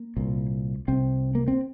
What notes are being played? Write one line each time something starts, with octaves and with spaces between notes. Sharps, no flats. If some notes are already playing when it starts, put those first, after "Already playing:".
Already playing: A#3
C2 A#2
C2 C3 C4
A#3
C4